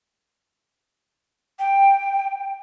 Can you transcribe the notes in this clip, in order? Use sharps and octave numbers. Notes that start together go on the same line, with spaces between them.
G5